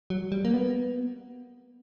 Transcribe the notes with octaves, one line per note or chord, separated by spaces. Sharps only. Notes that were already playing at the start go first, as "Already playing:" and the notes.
F#3
G3
A#3
B3